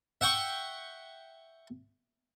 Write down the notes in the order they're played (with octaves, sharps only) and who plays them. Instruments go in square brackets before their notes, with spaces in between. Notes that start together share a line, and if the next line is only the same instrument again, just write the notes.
[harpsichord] E5 F#5 G5 C#6